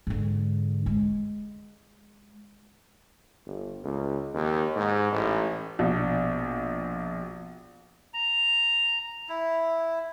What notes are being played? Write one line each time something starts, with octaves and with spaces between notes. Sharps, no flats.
G#2 D3
G#3
G1
C#2
D#2
G#2
A1
A#1 B2
A#5
E4